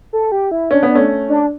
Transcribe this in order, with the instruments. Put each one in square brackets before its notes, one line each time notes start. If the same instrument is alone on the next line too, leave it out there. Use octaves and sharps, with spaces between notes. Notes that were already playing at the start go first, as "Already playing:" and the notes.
[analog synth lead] A4
G4
E4
[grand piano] C#4 [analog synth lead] D4
[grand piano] B3
[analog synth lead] D4
[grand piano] A3 C#4
[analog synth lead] D4